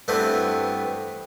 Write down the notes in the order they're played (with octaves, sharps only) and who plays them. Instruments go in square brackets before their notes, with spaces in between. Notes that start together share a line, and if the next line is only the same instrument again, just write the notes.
[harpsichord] G2 A3 B3 C4 E4